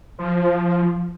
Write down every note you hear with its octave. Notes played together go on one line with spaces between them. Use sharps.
F3